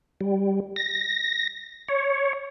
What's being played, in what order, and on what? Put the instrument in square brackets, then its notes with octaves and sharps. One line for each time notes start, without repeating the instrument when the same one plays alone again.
[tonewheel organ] G3
A#6
C#5